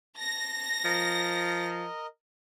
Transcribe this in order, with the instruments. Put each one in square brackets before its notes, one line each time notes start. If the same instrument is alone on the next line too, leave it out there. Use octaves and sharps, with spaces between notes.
[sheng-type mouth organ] A5 [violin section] A#6
[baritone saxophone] F3 [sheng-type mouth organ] A#4 D#5